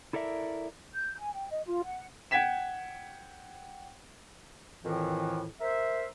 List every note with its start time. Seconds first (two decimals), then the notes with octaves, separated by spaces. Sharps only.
0.13 E4 A4 A#4 D5 E5
0.93 G6
1.19 G#5
1.34 G5
1.51 D#5
1.66 F4
1.84 F#5
2.31 F#5 G5 G#6 B6 E7
4.85 F2 A2 D#3 E3
5.61 A#4 C5 E5